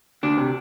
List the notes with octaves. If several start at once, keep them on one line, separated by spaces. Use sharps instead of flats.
D2 D4
C3